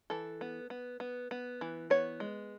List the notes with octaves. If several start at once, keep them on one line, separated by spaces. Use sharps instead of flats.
E3 A4
B3
B3
B3
B3
E3
B3 C#5
G#3